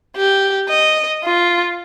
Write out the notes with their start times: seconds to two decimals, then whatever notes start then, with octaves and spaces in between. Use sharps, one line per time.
0.16 G4
0.69 D#5
1.23 F4